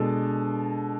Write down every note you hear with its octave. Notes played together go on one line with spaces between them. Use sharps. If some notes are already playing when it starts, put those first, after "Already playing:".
Already playing: B2 G#3 D4 A4